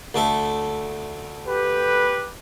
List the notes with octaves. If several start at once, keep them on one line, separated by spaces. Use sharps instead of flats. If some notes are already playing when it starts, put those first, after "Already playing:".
D2 A3 A4
G4 B4